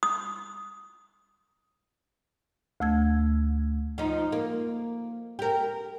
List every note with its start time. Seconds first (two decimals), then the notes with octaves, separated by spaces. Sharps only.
0.03 D#6
2.80 D2 A3 E6 G#6
3.98 F3 D#4
4.32 A#3
5.39 G4 A#4